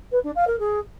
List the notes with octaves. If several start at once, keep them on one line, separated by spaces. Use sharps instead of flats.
B4
D4
F5
A#4
G#4